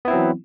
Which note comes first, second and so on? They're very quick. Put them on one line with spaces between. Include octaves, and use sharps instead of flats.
B3 E4 C4 F#3 E3